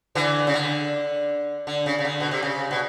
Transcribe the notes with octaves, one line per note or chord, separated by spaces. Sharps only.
D3 E3
C#3
D3
D3
C#3
C#3
D3
B2
C3
C#3
B2